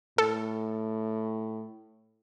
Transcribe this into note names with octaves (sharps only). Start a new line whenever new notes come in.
A2 A4